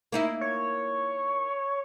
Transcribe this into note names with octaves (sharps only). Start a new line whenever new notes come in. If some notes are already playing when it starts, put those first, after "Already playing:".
A#3 D#4 E4
C#5